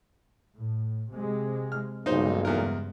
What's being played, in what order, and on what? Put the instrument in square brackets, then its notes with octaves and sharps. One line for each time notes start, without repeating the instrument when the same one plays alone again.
[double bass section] A2
C3 G#3
[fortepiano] F6
[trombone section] B1 A#2 [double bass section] G2 C#3 G#3 [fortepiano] D#4 C5
[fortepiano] E2 A#4